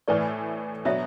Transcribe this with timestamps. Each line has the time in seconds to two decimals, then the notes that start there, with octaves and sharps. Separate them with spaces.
0.08 A2 E3 A3 B4 D5
0.85 B2 F#3 B3 D4 C#5 E5